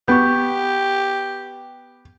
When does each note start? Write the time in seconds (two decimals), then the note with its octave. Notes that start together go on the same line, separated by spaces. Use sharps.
0.08 B3 G4 C#6 G6